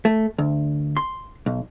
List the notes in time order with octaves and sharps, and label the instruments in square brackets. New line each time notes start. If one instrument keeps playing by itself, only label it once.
[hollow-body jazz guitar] A3
D2
C6
B1